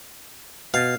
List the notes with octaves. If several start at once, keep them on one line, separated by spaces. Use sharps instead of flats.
B2 F5